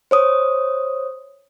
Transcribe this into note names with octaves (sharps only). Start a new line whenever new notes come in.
C5 C#5 D#6